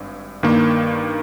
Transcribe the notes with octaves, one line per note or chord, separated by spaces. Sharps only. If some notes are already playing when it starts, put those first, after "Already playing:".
Already playing: G#1 G2
G2 D#3 A#3